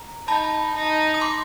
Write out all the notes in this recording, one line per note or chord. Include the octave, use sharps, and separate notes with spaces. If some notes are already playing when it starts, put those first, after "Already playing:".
Already playing: A#5
D#4 A5 B5
D#4
D#6
C6 D6